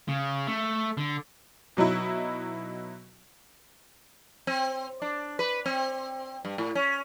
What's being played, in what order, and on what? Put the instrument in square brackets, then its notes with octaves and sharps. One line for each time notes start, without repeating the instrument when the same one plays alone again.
[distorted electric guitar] C#3
A3
D3
[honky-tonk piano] B2 F#3 D#4 E4
[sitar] C4
D4
B4
C4
G2
A2
C#4